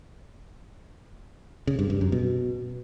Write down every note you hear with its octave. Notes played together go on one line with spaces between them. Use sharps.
C#3
G2
G2
F#2
B2